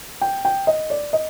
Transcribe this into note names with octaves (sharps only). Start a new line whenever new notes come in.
G5
G5
D#5
D5
D#5